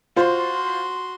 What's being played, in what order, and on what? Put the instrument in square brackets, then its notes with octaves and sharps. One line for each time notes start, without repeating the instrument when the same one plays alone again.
[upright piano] F4 C5 [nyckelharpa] F#4 C6